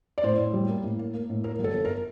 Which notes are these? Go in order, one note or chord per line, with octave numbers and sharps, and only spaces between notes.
D5
A2 C5
A2
G3
A#3
A2
A#3
A#3
A2
A#3 A#4
G1
A4
G1
A#4